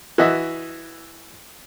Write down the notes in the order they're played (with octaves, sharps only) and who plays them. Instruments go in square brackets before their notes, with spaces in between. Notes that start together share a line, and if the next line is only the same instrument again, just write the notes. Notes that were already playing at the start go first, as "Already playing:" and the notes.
[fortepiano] E3 F#4 D#5 E5